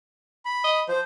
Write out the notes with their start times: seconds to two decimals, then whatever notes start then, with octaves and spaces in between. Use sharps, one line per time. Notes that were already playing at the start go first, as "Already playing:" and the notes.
0.45 B5
0.64 D#5
0.88 F3 C5